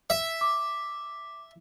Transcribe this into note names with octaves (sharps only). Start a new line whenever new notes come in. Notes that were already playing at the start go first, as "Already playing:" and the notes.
E5
D6